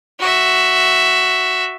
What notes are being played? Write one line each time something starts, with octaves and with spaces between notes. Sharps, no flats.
F#4 E5